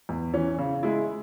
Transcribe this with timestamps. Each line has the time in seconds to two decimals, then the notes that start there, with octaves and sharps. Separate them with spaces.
0.09 E2
0.34 E3 C#4
0.58 C#3
0.83 G#3 E4